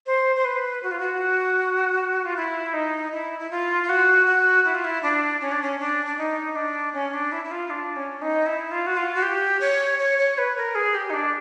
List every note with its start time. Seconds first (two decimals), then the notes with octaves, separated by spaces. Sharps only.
0.06 C5
0.36 C5
0.45 B4
0.83 F#4
0.91 F4
0.99 F#4
2.25 F4
2.36 E4
2.74 D#4
3.12 E4
3.39 E4
3.51 F4
3.83 F4
3.89 F#4
4.26 F#4
4.65 E4
4.75 F4
4.84 E4
5.03 D4
5.41 C#4
5.52 D4
5.62 C#4
5.80 D4
6.06 D4
6.18 D#4
6.55 D4
6.93 C#4
7.14 D4
7.32 E4
7.45 E4
7.51 F4
7.70 D4
7.96 C#4
8.22 D#4
8.46 E4
8.71 F4
8.87 F#4
8.97 F4
9.15 F#4
9.23 G4
9.60 C#5
9.99 C#5
10.19 C#5
10.38 B4
10.57 A#4
10.75 G#4
10.94 G4
11.10 D#4
11.14 D4